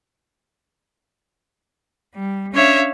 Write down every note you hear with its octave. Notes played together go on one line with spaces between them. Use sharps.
G3
C#4 D4 C#5 E5 F5